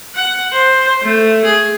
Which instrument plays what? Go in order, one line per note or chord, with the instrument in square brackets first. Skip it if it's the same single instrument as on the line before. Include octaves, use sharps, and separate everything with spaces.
[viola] F#5
C5
A3
G#4